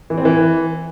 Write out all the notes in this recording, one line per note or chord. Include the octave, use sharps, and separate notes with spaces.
E3
C4
E3